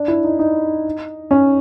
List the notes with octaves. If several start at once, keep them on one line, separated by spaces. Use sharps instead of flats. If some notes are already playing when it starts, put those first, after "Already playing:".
Already playing: D4
E4
D#4
D#4
C#4